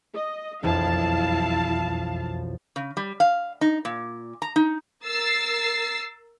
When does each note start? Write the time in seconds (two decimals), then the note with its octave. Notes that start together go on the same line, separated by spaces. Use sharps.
0.15 D#5
0.63 E1 B1 F2 E4 F5 A5
2.76 C#3
2.97 G3
3.20 F5
3.61 D#4
3.85 A#2
4.42 A#5
4.56 D#4
5.05 A#4 E6 A6 C7